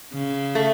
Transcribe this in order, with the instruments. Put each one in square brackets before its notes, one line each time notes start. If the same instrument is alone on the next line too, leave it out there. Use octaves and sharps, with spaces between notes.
[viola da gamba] C#3
[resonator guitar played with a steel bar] A3